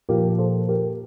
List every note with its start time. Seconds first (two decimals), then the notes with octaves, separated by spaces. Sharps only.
0.09 A#2 F3 G4 A#4
0.38 A4 C5
0.69 G4 A#4